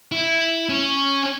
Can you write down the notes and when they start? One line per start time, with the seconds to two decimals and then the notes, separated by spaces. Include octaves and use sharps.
0.12 E4
0.69 C#4